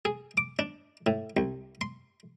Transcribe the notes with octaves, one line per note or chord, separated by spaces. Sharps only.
G#4
D6
D4
A2
C2
C6